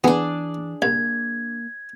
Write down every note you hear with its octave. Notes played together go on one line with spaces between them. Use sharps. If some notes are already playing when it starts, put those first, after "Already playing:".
E3 B3 D4 G#4
C2 A#3 G#6